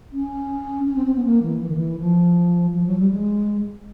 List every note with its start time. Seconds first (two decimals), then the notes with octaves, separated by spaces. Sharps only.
0.13 C#4
0.87 C#4
0.96 C4
1.06 C4
1.16 B3
1.25 A#3
1.43 E3
1.61 E3
1.69 D#3
1.77 E3
1.99 F3
2.74 F3
2.87 F#3
2.99 G3
3.11 G#3